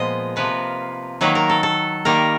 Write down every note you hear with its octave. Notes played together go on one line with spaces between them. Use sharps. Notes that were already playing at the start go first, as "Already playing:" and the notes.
Already playing: A#2 F3 G#3 B3 D#5
C3 F3 A#3 B4
D#3 F#3 A#3 B4
A#4
A4
A4
D#3 G3 A#3 A#4